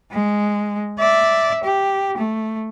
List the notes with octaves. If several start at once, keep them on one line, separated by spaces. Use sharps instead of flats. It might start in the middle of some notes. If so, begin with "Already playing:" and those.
G#3
D5 E5
G4
A3